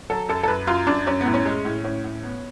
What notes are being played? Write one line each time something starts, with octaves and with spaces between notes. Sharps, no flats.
F#3 A4
F#2 A4
A4
F#2 B4
F#2 F4
F#2 D4
F#2 C#4
B3
A2
C#4
G#3
A2
A2 C#4
A2
B3